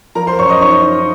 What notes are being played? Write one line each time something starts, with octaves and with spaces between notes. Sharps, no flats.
F3 A#4 A#5
C5 C6
F#2 C#5 C#6
D#5 D#6
D#4 C#5 C#6
D#4